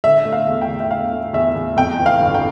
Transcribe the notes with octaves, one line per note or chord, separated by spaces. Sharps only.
D3 E5
A3
F5
E2
G5
E2
E5
D3 F5
A3
E2 E5
E2
F2 G5
E3
F5
G1
G5